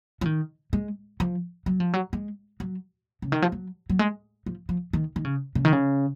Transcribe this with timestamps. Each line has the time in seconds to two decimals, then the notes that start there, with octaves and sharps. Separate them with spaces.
0.21 F3
0.26 D#3
0.73 G#3
1.20 F3
1.66 F#3
1.80 F3
1.93 F#3
2.13 G#3
2.60 F#3
3.22 C#3
3.32 D#3
3.42 F3
3.52 F#3
3.90 F#3
3.99 G#3
4.46 F3
4.69 F3
4.93 D#3
5.16 D#3
5.25 C#3
5.55 C#3
5.65 D#3
5.73 C#3